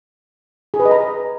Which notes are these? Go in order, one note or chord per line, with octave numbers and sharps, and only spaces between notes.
G#4
B4
D#5
A#5